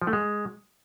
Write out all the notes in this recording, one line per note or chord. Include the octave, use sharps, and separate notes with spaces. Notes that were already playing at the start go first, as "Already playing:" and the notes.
F3
A3
G#3